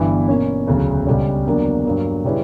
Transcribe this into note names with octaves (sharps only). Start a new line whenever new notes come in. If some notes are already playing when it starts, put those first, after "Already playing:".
Already playing: G1 G2 E3 B3 E4
B2 A#3 C#4
E1 D2 C#3 F#3
C#2 C#3 G3 C#4
E2 D3 F#3 A#3 D4
G2 F#3 A#3
C#3 G3 C#4 E4 B4